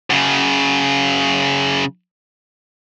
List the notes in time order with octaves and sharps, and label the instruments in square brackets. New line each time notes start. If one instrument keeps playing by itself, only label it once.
[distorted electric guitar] F#2 C#3